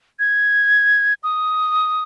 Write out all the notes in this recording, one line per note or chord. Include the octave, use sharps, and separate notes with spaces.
G#6
D#6